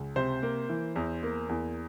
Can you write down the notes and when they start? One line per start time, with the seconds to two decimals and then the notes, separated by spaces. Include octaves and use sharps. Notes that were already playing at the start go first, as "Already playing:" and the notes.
Already playing: C#2
0.16 C3 C5
0.43 A#3
0.69 E3
0.96 E2
1.23 A#3
1.49 E2